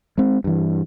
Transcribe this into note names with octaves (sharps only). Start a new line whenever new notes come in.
G#3 C4
G2 E3